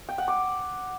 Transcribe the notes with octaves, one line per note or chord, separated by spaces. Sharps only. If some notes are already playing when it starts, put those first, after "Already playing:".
G5
F#5
D6